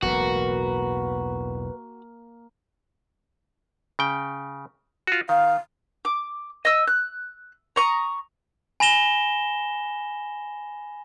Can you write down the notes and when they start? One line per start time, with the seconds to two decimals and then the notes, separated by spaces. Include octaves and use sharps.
0.03 E1 B1 A2 A#3 F#4 B4
3.99 C#3 G5
5.07 F4 F#4
5.29 D#3 F5
6.05 D6
6.65 D#5 E6
6.87 F#6
7.76 A#5 C#6 D#6
8.80 G#5 B5 A#6 E7 G7